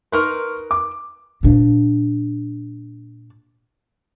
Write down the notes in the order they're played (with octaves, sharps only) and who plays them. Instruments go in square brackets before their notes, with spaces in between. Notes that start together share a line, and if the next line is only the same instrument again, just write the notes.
[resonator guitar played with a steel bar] D#4 A#4 B4 [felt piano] C6 C#6 F6
[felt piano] D6
[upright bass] A#2 D4